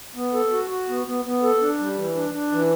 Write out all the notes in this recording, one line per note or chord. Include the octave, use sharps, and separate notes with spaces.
B3
A4
F#4
F#4
B3
B3
B3
A4
D4
G3
E3
D4
D4
E3